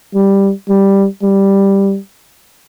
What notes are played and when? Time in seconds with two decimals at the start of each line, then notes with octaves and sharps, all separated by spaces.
0.15 G3
0.69 G3
1.23 G3